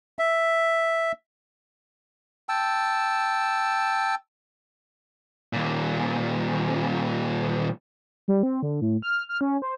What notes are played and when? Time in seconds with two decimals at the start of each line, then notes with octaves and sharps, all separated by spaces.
0.19 E5
2.49 G5 A5 E6
5.53 D#2 A#2
8.28 G3
8.43 C4
8.63 D3
8.82 A2
9.02 F6
9.29 F6
9.41 C#4
9.62 C5